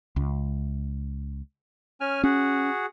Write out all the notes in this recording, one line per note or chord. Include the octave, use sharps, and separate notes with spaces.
C#2
C#4 G#5 F6
C#4 F#4 G#4 F#5